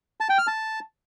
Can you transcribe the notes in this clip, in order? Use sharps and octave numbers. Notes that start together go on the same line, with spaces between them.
A5
G5
F6
A5